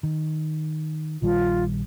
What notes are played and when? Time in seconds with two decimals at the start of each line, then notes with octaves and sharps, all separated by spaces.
0.03 D#3
1.22 A#1 D#3 G3 F4